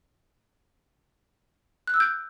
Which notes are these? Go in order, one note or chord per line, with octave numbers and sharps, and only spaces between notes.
F#6
E6
G6